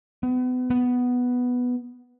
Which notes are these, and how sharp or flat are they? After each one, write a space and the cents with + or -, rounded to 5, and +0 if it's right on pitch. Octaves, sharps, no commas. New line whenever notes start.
B3 +35
B3 +0